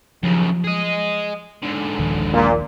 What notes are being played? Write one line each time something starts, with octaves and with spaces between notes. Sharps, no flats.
D#2 C#3 F3 F#3
G#4 D#5
G#2 D3
D#1 A#1 D#3
A#2